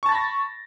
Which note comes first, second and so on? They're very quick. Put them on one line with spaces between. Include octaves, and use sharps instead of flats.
C#6 A5 A6 B5 A#6